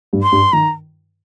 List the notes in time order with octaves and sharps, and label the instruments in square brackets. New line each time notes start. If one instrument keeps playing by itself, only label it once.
[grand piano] G2 G3
[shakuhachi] C6
[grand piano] G2 G3
[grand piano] D#3 [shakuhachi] A#5